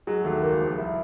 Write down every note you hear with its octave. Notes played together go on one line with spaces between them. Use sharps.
F#3 G#3
D#2 A3
C#2 A#3
F3
C2 E4